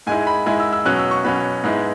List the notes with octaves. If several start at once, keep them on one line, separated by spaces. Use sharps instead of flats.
G#2 G#3 E4 G#5
B5
G#2 G#3 E4 G#5
E6
E6
B2 F#3 C#4 F#6
E6
C#6
B2 F#3 C#4 B5
G#2 G#3 B3 E4